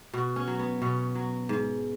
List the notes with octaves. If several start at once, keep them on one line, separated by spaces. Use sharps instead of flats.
B2 F#4
C#4
F#3
B3
B2 C#4
F#3
G#2